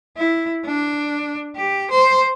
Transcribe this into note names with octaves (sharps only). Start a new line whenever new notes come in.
E4
D4
G4
C5